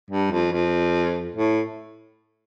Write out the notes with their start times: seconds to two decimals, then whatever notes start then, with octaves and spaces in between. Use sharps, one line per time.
0.10 G2
0.31 F2
0.52 F2
1.36 A2